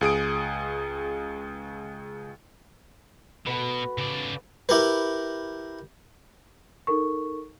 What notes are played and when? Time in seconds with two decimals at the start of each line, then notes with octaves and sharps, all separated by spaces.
0.01 C#2 G#4 D#6 D7
3.47 B2 F#4 A4 B4
3.98 C#3 D5
4.69 E4 G4 A#4 B4
6.87 D#4 A4 A#4 C#6